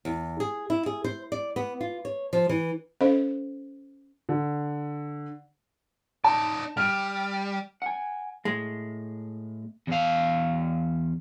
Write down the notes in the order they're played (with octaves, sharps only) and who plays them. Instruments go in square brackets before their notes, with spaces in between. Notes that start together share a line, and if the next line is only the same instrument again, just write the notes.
[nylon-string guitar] E2
G#4
E4
G#4
C5
D5
B3
F4
C#5
F3
E3
[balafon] C#4 A4 C5 D#5 F5
[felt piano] D3
[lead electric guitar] D#4 D5 [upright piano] A5
[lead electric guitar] G3 [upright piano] F6 D7
[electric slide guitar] F#5 G#5
[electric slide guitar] A2 [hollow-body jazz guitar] G#3
[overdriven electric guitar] E2 F5